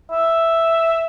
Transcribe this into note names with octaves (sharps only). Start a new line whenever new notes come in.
E5